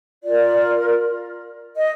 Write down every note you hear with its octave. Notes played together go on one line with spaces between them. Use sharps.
F4 A#4 D5
D#5